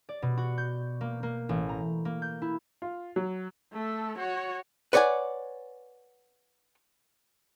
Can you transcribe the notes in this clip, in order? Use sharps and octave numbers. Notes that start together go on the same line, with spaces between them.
D5
B2
F#4
G6
A#3
A#3
A1
A#5
A#3
G6
E4
F4
F#3
A3 A4
F#4 C#5
B4 C#5 D5 F#5 G#5